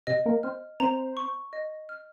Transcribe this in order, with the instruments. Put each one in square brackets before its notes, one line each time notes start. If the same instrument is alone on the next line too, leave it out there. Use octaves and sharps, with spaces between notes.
[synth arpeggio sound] C3 C4 [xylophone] D#5
[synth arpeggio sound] A#3 A#4
[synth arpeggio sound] C4 C5 [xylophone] F6
[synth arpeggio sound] C4 C5 [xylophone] A#5
[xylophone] C#6
D#5
F6